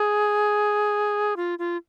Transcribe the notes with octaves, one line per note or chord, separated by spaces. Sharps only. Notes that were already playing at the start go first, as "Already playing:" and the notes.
Already playing: G#4
F4
F4